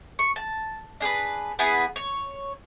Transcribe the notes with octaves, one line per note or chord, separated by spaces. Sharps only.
C#6
A5
D4 G#4 A#4 B4
B3 E4 G#4 B4
C#5